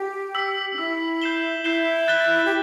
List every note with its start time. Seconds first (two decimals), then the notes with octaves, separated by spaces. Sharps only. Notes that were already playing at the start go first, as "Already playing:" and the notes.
Already playing: G4
0.35 E6 B6 F#7
0.74 D4
0.78 E4 E6 B6 F#7
1.22 G6 C7 E7 G7
1.64 E4 G6 C7 E7 G7
2.08 F#6 A6 E7 G7
2.45 G4